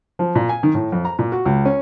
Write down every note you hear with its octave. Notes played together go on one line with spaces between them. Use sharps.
F3
A#2
G#5
D#3
A2
F2
A#5
A#2
F#4
C#2
C#4